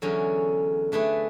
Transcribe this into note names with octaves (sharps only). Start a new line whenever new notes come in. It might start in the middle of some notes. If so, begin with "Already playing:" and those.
E2 D3 F#3 C#4 G#4
D3 A3 D4 G#4 B4